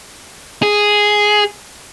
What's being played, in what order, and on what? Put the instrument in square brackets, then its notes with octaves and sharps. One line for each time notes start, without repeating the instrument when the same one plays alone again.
[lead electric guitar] G#4